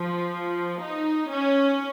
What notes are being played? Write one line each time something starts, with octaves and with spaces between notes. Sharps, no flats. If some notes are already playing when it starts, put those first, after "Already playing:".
Already playing: F3
D#4
C#4